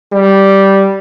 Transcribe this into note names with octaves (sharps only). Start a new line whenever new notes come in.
G3